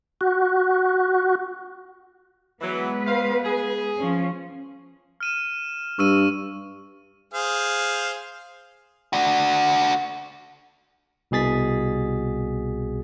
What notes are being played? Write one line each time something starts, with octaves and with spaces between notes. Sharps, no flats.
F#4
E3 F#3 G#3 B3 B4
C5 F5
G#4
F3 C#4
F6 D#7 E7
G2 C#6 E6 D#7
G#4 C5 F5
D4 F#4
C2 B2 G#4 A6 B6